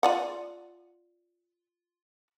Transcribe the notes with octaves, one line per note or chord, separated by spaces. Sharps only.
F4 D5 F#5